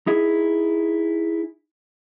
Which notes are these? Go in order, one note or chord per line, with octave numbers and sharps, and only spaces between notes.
D#4 E4 G#4